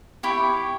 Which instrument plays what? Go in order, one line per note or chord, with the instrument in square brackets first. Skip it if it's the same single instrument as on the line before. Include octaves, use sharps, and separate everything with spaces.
[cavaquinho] E4 G4 C#5